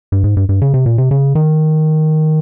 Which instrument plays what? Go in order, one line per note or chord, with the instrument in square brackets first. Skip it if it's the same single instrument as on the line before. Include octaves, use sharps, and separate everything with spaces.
[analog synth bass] G2
G#2
G2
G2
C#3
C3
A#2
C3
C#3
D#3